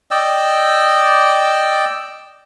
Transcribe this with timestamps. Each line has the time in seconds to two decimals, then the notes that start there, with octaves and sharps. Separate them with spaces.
0.11 D5 D#5 G5 E6